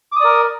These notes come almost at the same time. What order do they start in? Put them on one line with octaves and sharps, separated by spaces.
D6 D#6 D5 A#4